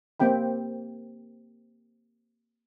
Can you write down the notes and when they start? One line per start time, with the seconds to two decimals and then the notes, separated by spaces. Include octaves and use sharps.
0.20 A#3 C4 G4 G5 B5